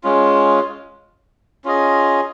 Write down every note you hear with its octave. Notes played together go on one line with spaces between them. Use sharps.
G#3 C#4 F4
C#4 F4 G#4 D#5